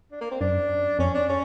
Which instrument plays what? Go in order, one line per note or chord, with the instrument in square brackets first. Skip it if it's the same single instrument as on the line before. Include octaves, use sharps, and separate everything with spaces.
[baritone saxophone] D4
A#3
C4
[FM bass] F#2 [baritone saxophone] D4
[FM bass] F2 [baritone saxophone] C#4
[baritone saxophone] D4
C#4